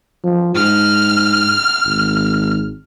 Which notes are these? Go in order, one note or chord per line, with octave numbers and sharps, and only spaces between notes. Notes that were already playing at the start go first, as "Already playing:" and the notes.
F3
G#2 F6
G#1